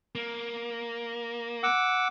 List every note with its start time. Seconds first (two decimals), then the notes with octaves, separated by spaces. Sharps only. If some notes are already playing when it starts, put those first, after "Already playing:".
0.15 A#3
1.63 F#5 D6 E6